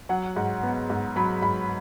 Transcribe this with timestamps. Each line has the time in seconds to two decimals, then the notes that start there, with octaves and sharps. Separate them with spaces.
0.09 F#3 F#5
0.36 G#2
0.63 B3
0.90 G#2
1.16 F#3 B5
1.42 G#2 B5